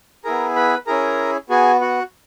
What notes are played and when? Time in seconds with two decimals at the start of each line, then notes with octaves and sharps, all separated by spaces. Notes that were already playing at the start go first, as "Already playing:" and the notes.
0.24 B3 E4 G#4 A#4 A#5
0.56 B4 B5
0.87 C#4 E4 G#4 A#4 A#5
1.50 B3 F#4 G#4 G#5
1.81 F#4 F#5